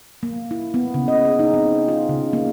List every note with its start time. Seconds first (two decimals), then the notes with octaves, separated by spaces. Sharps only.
0.23 A#3
0.51 E4
0.74 B3
0.94 C#3
1.08 D#5
1.25 G#4
1.39 D#4
1.54 C4
1.88 F4
2.09 C#3
2.33 A#3